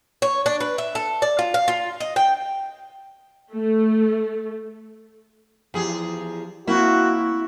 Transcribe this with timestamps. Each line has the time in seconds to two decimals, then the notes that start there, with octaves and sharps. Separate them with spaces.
0.22 C#5
0.46 D4
0.60 B4
0.78 E5
0.95 A4
1.22 D5
1.39 F4
1.54 F5
1.68 F4
2.00 D#5
2.16 G5
3.54 A3
5.74 E2 F3 G4 G#4
6.67 A#3 C4 E4 F#4 F5